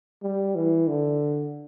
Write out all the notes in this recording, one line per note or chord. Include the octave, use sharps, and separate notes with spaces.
G3
E3
D3